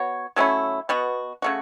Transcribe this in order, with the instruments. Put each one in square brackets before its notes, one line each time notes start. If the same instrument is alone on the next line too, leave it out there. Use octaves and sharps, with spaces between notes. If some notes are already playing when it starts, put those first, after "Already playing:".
Already playing: [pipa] B3 F#4 C#5
F#3 A3 C#4 E4
B2 B3 F#4
C#3 A3 F#4